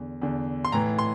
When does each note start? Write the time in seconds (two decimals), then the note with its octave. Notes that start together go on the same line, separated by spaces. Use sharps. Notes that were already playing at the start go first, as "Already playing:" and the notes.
Already playing: E2 D3
0.22 E2 D3
0.65 C6
0.72 A2 E3 A#5
0.99 C6